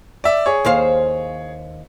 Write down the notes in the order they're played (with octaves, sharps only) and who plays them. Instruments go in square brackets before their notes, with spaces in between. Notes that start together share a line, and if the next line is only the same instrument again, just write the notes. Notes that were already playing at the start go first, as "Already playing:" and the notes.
[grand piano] D5 E5
G#4 C#5
[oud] D#2 C5 F5